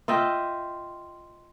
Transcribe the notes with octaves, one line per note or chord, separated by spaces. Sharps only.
F4 D#5 E5 G5